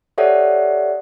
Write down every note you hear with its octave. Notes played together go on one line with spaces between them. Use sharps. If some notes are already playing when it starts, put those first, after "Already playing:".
G4 A4 C#5 D5 E5 F#5